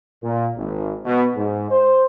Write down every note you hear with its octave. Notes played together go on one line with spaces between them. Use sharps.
A#2
G#1
B2
G#2
C5